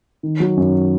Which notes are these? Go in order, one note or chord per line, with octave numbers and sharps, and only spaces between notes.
D#3
F#3
F#2